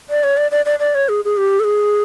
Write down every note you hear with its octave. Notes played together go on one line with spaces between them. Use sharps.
D5
C#5
D5
D5
D5
D5
C#5
G#4
G#4
G4
A4
G#4